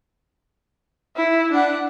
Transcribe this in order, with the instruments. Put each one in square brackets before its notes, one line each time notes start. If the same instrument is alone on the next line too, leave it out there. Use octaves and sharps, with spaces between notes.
[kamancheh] E4
D4 F#5